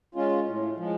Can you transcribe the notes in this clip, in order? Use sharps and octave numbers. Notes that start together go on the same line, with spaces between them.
G#3 C#4 F4
A2
F3 G#3